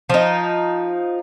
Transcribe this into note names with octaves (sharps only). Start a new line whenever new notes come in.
F3 D#4